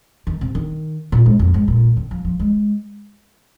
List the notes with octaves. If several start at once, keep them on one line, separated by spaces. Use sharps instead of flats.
D#3
C3
D#3
A#2
G#2
F2
G#2
A#2
D#3
F3
F3
G#3